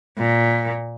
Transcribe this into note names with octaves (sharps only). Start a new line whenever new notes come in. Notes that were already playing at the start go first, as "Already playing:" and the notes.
A#2